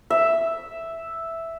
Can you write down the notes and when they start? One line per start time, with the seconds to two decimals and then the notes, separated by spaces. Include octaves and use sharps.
0.10 E5